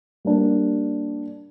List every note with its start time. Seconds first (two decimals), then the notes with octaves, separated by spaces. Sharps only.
0.25 G3 A#3 D4